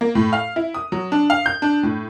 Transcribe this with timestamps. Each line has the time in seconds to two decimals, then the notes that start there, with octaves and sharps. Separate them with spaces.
0.01 A#3
0.15 A2
0.33 F5
0.56 E4
0.74 D#6
0.92 F#3
1.12 D4
1.30 F5
1.46 G6
1.62 D4
1.83 A2